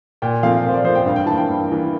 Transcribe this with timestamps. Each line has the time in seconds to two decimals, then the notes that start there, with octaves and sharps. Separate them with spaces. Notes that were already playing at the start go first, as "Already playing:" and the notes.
0.22 A#2 G5
0.43 F3 A3 C4 F5
0.64 A#2 C5
0.74 D5
0.84 F3 A3 C4 C5
0.95 G5
1.06 G2 F5
1.16 G5
1.26 E3 A#3 A5
1.38 G5
1.48 G2
1.68 E3 A#3